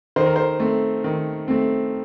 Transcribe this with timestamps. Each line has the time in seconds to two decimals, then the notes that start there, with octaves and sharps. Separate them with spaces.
0.16 D#3 C5
0.26 A#4
0.36 C5
0.60 A3 C4
1.04 D#3
1.48 A3 C4